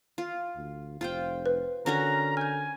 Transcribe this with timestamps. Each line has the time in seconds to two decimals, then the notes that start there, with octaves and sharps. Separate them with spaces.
0.18 F4
0.56 D2
1.01 F1 F4 C5 G5
1.46 B4
1.86 D3 C#4 F#4 A#4 A#5
2.37 G#5 F6 G6